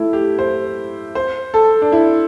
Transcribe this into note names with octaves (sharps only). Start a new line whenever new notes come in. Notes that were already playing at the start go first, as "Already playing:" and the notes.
Already playing: A3 E4
G4
C5
C5
A4
D4
E4